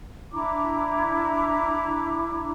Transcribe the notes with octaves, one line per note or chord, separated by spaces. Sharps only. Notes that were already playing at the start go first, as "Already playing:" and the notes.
D4 E4 A#5 D6